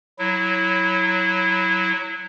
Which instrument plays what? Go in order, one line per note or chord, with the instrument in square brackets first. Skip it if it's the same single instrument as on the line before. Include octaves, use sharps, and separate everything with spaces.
[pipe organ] F#3 E4